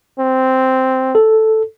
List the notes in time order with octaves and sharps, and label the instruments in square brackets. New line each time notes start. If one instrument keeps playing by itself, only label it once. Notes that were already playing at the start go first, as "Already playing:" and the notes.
[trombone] C4
[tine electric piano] A4